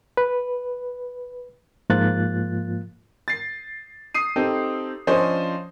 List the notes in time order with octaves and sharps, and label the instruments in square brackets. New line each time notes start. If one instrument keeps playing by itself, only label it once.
[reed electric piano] B4
G#2 F3 A#3 F4 F#6 A6
[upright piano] A6 C7
D#6 C7 D#7
C4 D#4 G4 A4
F3 C#4 D4 C5 D#5